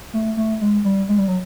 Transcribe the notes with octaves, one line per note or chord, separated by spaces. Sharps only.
A3
A3
G#3
G3
G#3
G3
F#3